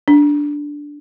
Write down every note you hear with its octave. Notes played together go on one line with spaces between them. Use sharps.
D4